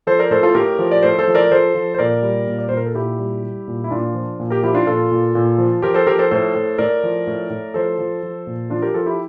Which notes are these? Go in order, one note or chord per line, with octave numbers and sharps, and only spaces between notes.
F3 A4 C5
A#4 D5
A2 A4 C5
F4 A4
A2 G4 A#4
F3
D5
A2 A4 C5
A4 C5
F3
A#4 D5
F3 A4 C5
F3
C5
A#2 A#4 D5
G3
A#2
D5
A#2 C5
A#4
A4
A#2 E4 G4
G3
G3
A#2
E4
A#2 D4 F4
F3
A#2
G4 A#4
F3 E4 G4
D4 F4
A#2 F4 A4
A#2
A#2
F3
F3 G4 A#4
A4 C5
F3 G4 A#4
A4 C5
A2 A4 C5
A2
A2 A#4 D5
F3
A2
A2
F3 A4 C5
F3
F3
A#2
F3 D4 F4
G4 A#4
F3 F4 A4
E4 G4